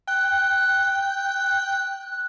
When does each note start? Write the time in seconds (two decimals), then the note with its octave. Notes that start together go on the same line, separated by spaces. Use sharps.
0.07 G5 F#6